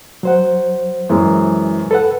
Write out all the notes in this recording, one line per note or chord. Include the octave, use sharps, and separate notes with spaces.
F#3 C5 F#5
F#2 E3 G#3
A4 B4 F#5